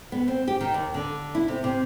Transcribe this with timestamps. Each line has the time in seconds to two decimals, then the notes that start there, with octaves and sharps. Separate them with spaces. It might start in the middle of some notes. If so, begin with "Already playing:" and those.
0.12 B3
0.28 C4
0.48 G4
0.61 D#3
0.74 D#2
0.94 D3
1.35 E4
1.48 C3
1.64 C3